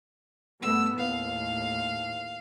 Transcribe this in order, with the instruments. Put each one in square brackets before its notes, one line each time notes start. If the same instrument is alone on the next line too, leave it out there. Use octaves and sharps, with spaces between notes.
[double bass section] G2 A3 B3 [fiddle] E6
[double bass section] D#2 A2 [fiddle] F5